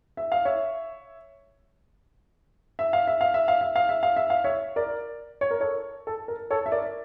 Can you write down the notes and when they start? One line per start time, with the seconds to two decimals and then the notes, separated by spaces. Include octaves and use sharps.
0.17 E5
0.32 F5
0.45 C#5 E5
2.79 E5
2.93 F5
3.07 E5
3.21 F5
3.34 E5
3.48 F5
3.61 E5
3.76 F5
3.89 E5
4.03 F5
4.16 E5
4.30 F5
4.44 C#5 E5
4.76 A#4 D5
5.41 C#5
5.51 A#4
5.60 A4 C#5
6.07 A4
6.28 A#4
6.51 A4 C#5
6.66 E5
6.72 A#4 D5